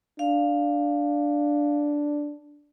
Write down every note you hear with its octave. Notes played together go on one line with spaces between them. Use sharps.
D4 F5